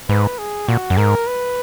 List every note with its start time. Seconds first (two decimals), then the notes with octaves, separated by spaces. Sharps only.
0.09 G#2 B4
0.39 G#4
0.68 A#2 F#4
0.90 F#2
0.97 G#2 A#4
1.27 B4